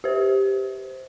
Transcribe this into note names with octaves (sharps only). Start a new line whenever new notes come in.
G4 C5